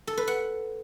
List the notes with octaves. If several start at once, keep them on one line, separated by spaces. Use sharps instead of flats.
A4
B4
F#5